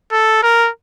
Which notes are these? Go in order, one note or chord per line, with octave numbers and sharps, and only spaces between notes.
A4
A#4